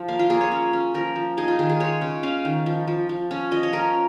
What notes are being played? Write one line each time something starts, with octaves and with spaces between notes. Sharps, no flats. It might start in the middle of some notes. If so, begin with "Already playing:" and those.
Already playing: F3
A#3 F5
F4
A#3 G#4
C#5
C#4
C#4
F3 A#4
F3
D#4 G#4
F4
D#3 G#4
G#4
G#3 C#5
C#3
C#4 F5
D#3
F3
F3
F3
C#4
F3 D#5
C#5
C#4 A#4